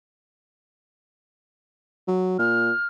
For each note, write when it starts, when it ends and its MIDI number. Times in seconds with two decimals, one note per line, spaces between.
2.08 2.38 54
2.39 2.71 46
2.39 2.88 89